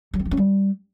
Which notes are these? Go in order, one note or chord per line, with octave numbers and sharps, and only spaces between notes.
F#3
C4
F3
C#4
G3